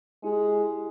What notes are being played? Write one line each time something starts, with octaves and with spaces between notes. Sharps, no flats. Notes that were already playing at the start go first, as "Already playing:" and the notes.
G#3 E4 G4